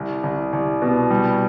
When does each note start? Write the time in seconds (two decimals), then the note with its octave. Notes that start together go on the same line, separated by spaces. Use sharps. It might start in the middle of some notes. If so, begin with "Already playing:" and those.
Already playing: C2
0.23 C2
0.53 C2
0.82 B2
1.11 G3